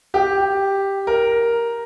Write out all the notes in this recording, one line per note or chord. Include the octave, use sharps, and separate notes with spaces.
G4
A#4